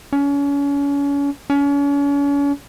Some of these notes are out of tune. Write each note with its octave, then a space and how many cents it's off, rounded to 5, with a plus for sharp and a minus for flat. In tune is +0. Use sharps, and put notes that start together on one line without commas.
C#4 +35
C#4 +40